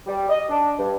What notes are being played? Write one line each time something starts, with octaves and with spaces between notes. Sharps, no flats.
G3
D#5
D4
G2